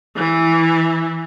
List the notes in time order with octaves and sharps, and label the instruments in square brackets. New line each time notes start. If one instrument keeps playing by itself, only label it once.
[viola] E3 E4